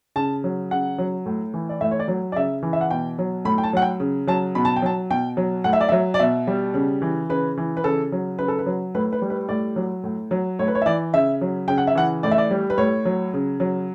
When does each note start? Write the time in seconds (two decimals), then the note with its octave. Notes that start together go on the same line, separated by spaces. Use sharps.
0.16 C#3 A5
0.44 F#3
0.71 C#3 F#5
0.98 F#3
1.26 A2
1.54 E3
1.69 D5
1.81 A2 E5
1.91 C#5
1.99 D5
2.08 F#3
2.32 D5
2.36 C#3 E5
2.63 E3
2.73 E5
2.81 F#5
2.91 B2 G5
3.19 F#3
3.45 A2 B5
3.58 G5
3.63 A5
3.73 F#3 F#5
3.82 G5
4.00 C#3
4.27 F#3 A5
4.55 B2 B5
4.65 A5
4.76 G5
4.82 F#3 A5
5.10 B2 G5
5.37 F#3
5.64 A2 F#5
5.73 E5
5.81 D5
5.89 F#3 E5
6.14 D5
6.20 B2 E5
6.47 G3
6.74 C#3
7.02 E3
7.29 C#3 B4
7.58 E3
7.77 B4
7.84 C#3 A4
8.12 F#3
8.39 C#3 B4
8.48 A4
8.59 B4
8.66 F#3
8.95 A2 B4
9.12 B4
9.22 G3
9.30 B4
9.49 A2 D5
9.76 F#3
10.04 A2
10.31 F#3
10.59 A2 C#5
10.68 B4
10.75 C#5
10.82 E5
10.86 E3 D5
11.14 C#3 E5
11.41 F#3
11.68 C#3 G5
11.78 F#5
11.87 E5
11.95 E3 F#5
12.23 A2 D5
12.31 E5
12.38 D5
12.51 G3
12.70 B4
12.78 A2 C#5
13.05 F#3
13.34 C#3
13.60 F#3